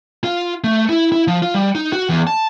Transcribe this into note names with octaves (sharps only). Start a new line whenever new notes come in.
F4
A3
E4
E4
F3
F4
G3
D#4
F#4
E2
A5